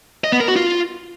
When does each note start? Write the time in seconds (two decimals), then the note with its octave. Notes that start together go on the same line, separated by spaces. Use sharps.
0.24 D#5
0.32 B3
0.40 A#4
0.48 F#4
0.56 F4